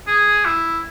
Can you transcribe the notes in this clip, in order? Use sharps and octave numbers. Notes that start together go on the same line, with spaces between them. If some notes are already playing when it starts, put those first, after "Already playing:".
G#4
E4